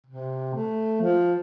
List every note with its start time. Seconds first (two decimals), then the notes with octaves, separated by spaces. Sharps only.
0.07 C3
0.54 A3
1.01 F3